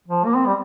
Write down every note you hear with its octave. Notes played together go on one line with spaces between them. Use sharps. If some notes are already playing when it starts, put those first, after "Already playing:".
F3
A#3
C4
G3